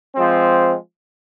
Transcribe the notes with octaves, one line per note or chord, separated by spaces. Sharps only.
F3 G#3 C4